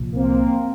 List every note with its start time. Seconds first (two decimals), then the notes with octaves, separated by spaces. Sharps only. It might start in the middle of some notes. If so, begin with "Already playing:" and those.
Already playing: C2 A#2 F3
0.15 A#3 C4